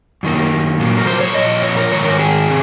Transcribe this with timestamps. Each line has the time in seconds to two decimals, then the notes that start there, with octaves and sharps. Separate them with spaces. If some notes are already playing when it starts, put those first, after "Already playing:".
0.23 F#2 D#3 A#3
0.79 A#2 F#3 A#3
0.98 A#4
1.07 C5
1.20 C#5
1.35 A#2 F3 D#5
1.63 C#5
1.77 A#4
1.91 G#2 D#3 G#3 C#5
2.05 A#4
2.19 G#4
2.48 C3